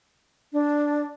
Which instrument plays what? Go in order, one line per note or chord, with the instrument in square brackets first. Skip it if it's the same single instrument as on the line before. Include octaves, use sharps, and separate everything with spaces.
[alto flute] D4